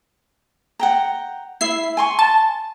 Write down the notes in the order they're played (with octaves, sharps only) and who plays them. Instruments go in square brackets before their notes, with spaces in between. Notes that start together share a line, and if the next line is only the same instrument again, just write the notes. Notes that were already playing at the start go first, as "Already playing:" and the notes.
[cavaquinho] F#5 G5 A#5
[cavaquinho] E4 E5 [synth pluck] C7
[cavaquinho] G#5 C6 C#6
[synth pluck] A5